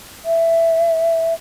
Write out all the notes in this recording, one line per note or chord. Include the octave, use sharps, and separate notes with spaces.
E5